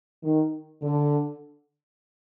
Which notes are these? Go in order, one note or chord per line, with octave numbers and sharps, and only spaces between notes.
D#3
D3